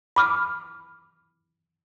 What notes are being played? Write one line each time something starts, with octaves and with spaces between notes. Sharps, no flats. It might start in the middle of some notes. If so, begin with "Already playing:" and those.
B5 D6 F6